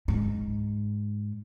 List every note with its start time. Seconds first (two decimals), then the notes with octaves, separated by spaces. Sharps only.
0.08 G#2